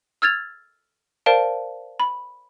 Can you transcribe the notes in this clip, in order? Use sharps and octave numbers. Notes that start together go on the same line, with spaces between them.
E6 F6 G#6 A6 F7
A#4 C5 D5 F5 A5 D7
B5